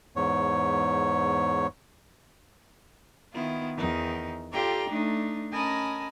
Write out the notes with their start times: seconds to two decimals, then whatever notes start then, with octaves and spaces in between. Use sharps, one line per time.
0.16 E2 G#2 C#5
3.32 D#3 B3 E4 F4
3.77 E2 D#3 D#4
4.52 F4 G4 A4 D5 G5 A#5
4.89 A3 D4 D#4
5.51 C#4 A#4 D#5 G#5 A5 B5